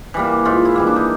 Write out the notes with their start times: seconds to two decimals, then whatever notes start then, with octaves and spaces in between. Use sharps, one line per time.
0.14 E3 G3 A#3
0.45 G#2 F4
0.65 E4
0.76 E3 G3 A#3
0.87 D4
0.96 D#4